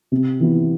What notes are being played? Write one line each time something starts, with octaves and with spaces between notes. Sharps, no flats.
C3
E3 B3 E4